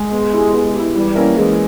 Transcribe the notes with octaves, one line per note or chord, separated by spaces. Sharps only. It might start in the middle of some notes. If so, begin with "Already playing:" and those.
Already playing: G#3
B3
E4 G4
B3
E4 G4
E3 G3
A#3 C#4 E4 A#4
E3 G#3